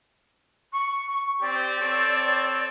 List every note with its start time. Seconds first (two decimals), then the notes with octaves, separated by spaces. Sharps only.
0.72 C#6
1.41 C4 G4 D5
1.79 C4 A4 C#5